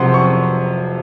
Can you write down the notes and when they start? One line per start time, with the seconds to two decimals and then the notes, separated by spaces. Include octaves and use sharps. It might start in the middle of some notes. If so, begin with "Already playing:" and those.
Already playing: F2 C3 F#3 C4 F#5 C6
0.14 C#6